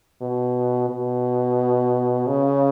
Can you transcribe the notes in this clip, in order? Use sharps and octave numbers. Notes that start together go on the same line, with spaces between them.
B2
B2
C#3